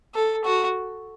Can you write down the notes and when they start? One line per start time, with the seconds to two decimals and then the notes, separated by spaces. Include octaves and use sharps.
0.15 A4
0.45 F#4